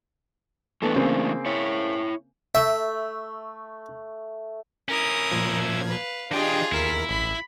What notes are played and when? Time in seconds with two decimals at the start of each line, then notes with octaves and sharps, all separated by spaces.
0.82 E3 A3 B3 D4 A4
0.96 C#3 A#3 C4
1.46 E4 C#5
2.55 A3 E5
4.89 C#4 E4 A#4 D#6
5.30 A#2 F3 G#6
5.86 B4 F5
6.31 E3 D4 F4 G4 G#4 D#5 G5
6.72 D#2 E4 A#4 B6
7.09 A1 B5